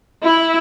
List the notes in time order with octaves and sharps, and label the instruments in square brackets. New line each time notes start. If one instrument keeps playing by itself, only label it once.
[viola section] E4